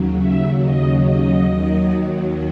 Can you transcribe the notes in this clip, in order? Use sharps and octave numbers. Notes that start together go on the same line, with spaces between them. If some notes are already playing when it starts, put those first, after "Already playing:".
Already playing: D#2 C#3 F#3
E5
D#5
D#5
D#2 D#3 F#3